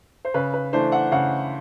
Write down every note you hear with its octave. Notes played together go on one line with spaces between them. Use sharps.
C5
C#3 B4
B4
E3 A3 D4 C5
F#5
C#3 F#5